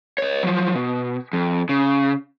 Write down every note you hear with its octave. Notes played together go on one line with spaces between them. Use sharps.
C#5 D#5
F3 F#3
B2
F2
C#3